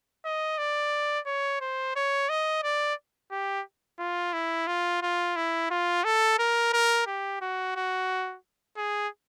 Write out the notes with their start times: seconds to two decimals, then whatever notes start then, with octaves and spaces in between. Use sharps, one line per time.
0.25 D#5
0.58 D5
1.26 C#5
1.61 C5
1.95 C#5
2.29 D#5
2.63 D5
3.32 G4
3.99 F4
4.33 E4
4.67 F4
5.02 F4
5.36 E4
5.70 F4
6.04 A4
6.39 A#4
6.73 A#4
7.07 G4
7.41 F#4
7.75 F#4
8.77 G#4